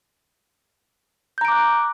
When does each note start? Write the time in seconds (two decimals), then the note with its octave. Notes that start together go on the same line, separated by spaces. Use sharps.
1.38 G6
1.41 A#5
1.45 D7
1.48 D6
1.52 F#6